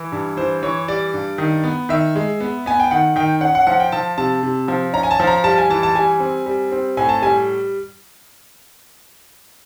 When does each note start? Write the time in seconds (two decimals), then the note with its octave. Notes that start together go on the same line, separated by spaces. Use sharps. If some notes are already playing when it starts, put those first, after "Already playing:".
Already playing: E3
0.12 G2
0.37 E3 C5
0.63 E3 C#5
0.88 G3 D5
1.14 G2
1.38 D#3
1.64 B3
1.89 D#3 E5
2.15 G#3
2.40 B3
2.66 B3 G#5
2.80 G5
2.91 D#3 F#5
3.16 D#3 G5
3.41 C#4 F#5
3.55 F#5
3.67 F3 F#5
3.80 G5
3.92 F3 A5
4.18 C3 A5
4.43 C3
4.68 F3
4.93 C#4 A#5
5.03 G#5
5.11 A5
5.20 F3
5.27 A#5
5.44 G3 A5
5.58 G#5
5.70 E3 A5
5.83 A5
5.95 G3 G#5
6.20 C4
6.46 G3
6.72 C4
6.97 A2 G#5
7.09 A5
7.22 G3 G#5